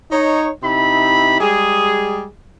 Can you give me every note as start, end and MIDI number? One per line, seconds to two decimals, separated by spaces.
0.10 0.49 63
0.10 0.49 73
0.63 1.39 48
0.63 1.39 63
0.63 1.39 64
0.63 1.39 83
1.40 2.27 55
1.40 2.27 56
1.40 2.27 68